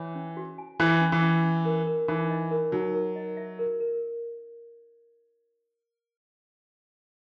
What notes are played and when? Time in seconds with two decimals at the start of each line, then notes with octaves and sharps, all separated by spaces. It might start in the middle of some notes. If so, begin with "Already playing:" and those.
Already playing: E3 C#5
0.15 C#4
0.37 F#4
0.58 G#5
0.80 E3 E4
1.01 C#4
1.12 E3
1.22 C#4
1.44 C#4
1.65 A#4
1.87 A#4
2.08 E3 D#4
2.30 D#5
2.51 A#4
2.72 F#3 D#4
2.94 A#4
3.16 D#5
3.37 E5
3.59 A#4
3.80 A#4